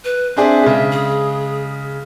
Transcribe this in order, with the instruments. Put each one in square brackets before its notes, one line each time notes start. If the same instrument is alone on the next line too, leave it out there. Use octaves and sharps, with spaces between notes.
[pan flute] B4
[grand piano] C4 D4 G#4 [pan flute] E5
[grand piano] C#3 G#3
[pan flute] G#4